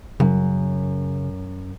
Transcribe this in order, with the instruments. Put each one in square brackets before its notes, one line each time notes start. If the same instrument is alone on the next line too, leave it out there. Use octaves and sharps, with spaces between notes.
[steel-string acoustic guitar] F#2 [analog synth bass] C#3